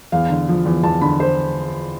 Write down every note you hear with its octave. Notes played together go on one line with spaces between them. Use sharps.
E2 F5
D3
F3
E2
E2 A5
D3 B5
C5